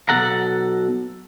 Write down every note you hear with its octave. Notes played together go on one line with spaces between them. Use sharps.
B1 G#2 B2 A4 F#5 A#5